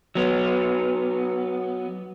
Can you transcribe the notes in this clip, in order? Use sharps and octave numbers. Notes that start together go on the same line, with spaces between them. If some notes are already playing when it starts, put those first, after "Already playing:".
F#3 B3